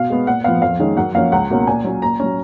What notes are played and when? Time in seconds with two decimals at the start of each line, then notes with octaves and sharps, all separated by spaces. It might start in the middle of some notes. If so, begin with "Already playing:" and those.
Already playing: B2 F5
0.10 G#3 B3
0.27 A#2 F#5
0.44 F3 B3 F5
0.62 F2 F5
0.79 D#3 G#3 C#4
0.97 F#2 F#5
1.14 F3 A#3 C#4 F5
1.32 C#2 F#5
1.50 B2 A#3 C#4
1.67 A#2 G#5
1.84 F#3 C#4
2.02 A#2 A#5
2.20 F#3 C#4